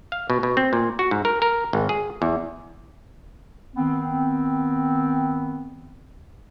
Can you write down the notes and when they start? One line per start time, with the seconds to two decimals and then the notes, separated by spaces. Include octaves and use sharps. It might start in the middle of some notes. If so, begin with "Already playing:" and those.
0.12 F5
0.30 B2
0.43 B2
0.57 C4
0.73 A#2
0.99 F#4
1.11 G#2
1.25 A#4
1.42 A#4
1.73 G#1
1.89 G#4
2.22 E2
3.76 D#3 B3 C4